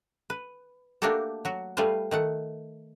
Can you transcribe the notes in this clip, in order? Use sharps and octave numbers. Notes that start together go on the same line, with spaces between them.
B4
A3 A#3 D4 F#4 G4 A4
F#3 F#4
G3 A3 F4 B4 C5
D#3 A3 F#5